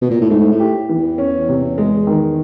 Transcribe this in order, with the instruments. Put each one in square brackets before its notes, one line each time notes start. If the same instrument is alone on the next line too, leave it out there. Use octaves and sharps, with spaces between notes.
[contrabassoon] B2
A#2
A2
[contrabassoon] G#2 [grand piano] A3
[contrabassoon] A2
[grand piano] G4
E3
[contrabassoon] E2
[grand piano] C#4
C3
G#3
D#3